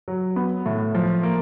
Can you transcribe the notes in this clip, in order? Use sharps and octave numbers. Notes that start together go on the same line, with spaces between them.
F#3
B3
A2
F3
A#3